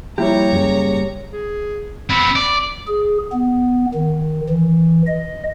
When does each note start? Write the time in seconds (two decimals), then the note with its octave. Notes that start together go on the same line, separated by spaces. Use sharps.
0.18 F3 G3 A#3 E4 G4 C#5 A#5
0.53 F#2 C#3
1.33 G#4
2.10 B3 C4 B5
2.36 D5 D6
2.87 G#4
3.33 B3
3.95 D#3
4.50 E3
5.07 D#5